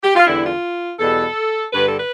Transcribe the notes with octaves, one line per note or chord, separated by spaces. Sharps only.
G4
F4
E2 D3 G3 E4
F4
E2 B2 G3 A4
G2 D3 G3 B4
A4
B4